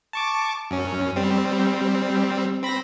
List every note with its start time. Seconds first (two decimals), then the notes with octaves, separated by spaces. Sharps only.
0.13 A5 C#6 D6
0.71 F#2 C#4
1.16 G3 C4
2.62 C4 B5 A#6